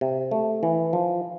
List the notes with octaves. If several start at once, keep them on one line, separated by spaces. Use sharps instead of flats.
C3
A3
E3
F3